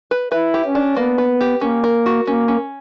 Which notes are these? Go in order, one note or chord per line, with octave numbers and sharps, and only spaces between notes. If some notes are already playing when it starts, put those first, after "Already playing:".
B4
E4 B4
G4
C#4
D4
A#3 B3
B4
G4
A#3 C#4
A#4
F#4
A#3 C#4
C#4